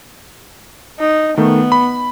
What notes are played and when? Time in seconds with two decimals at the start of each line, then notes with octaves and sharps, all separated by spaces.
1.00 D#4
1.38 D#3 A3 B3
1.72 B5